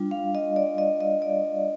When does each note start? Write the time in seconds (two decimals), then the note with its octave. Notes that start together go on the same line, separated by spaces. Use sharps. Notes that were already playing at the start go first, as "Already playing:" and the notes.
Already playing: G3 D4 F4
0.11 F5
0.35 D#5
0.56 D5
0.78 D#5
1.01 D#5
1.22 D5